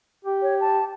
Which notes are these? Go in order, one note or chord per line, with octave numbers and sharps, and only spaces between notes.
G4
C#5
A5